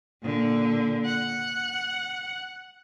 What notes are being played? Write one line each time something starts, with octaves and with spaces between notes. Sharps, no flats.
A#2 D3
F#5